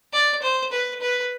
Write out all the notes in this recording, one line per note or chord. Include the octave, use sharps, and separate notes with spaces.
D5
C5
B4
B4